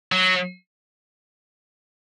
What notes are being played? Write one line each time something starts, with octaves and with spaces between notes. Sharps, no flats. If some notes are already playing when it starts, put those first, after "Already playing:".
F#3